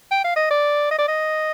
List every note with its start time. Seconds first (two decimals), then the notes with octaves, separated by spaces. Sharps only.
0.11 G5
0.24 F5
0.36 D#5
0.50 D5
0.91 D#5
0.98 D5
1.08 D#5